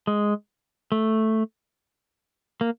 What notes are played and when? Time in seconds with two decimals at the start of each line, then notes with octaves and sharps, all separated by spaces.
0.07 G#3
0.92 A3
2.61 A#3